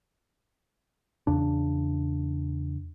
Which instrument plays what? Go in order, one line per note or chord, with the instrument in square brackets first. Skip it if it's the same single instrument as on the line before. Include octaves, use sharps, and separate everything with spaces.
[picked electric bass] E2 C#3 D4